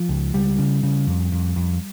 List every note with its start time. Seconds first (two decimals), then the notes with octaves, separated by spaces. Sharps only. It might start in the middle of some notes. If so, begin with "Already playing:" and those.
Already playing: F3
0.09 C#2
0.34 C#2 G3
0.59 C#3
0.83 C#3
1.07 F2
1.32 F2
1.56 F2